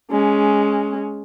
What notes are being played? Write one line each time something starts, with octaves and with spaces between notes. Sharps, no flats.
G#3 C#4